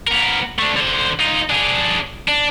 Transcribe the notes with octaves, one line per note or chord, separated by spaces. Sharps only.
B3 A#4
A3 D4
D3 C5
D#4 F4
D4 G#4
D4